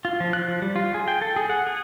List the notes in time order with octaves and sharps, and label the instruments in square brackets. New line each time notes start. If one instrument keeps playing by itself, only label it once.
[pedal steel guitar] F4
F3
F#6
F3
G3
F4
G#4
G5
A4
G#4
F#5
G#4